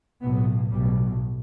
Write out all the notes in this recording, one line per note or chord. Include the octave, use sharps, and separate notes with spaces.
B1 A2 B3
B1 A2 G3